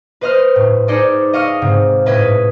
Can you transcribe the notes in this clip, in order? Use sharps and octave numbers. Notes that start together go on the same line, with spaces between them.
B4 C5 D#5 C6 F6
A2
D#4 G#4 A4 C5 D5 D#5
D#5 F5 C#6 D#6 F6
G#2 C3
A2 B4 D#5 D#6 G#6 B6